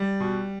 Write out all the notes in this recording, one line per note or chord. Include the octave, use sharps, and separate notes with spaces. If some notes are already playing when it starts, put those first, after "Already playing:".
Already playing: G3
B2